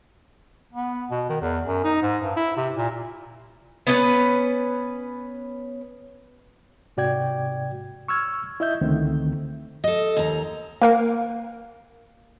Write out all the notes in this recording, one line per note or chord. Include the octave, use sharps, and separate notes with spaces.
B3
B2
D#3
E2
F#2
D#4
G#2
G2
E4
C3
A#2
B3 C#4 B4
G#2 C3 F#4 D5 G5 G#6
C#6 E6 F6 G#6
E4 D#5 E5 G6
C#2 D3 D#3 A3 C4
A4 D#5
D#2 A#5
A#3 A#4 F5